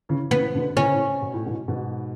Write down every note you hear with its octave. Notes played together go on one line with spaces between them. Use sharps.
C#3 E3
C#3 E3 B3
B2 D3
A2 C#3 C#4
B2
A2
G#2 B2
G#2 B2